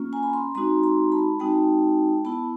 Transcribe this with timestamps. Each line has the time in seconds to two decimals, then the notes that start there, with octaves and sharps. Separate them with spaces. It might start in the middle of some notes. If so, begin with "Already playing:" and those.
Already playing: A#3 C#4 F4
0.13 G#5 A#5
0.23 B5
0.33 A#5 C6
0.55 G#3 C4 D#4 F#4 A#5 C6
0.83 A#5 C6
1.12 A5 B5
1.39 G#3 C4 D#4 F#4 G5 A5
2.25 B3 E4 A5 B5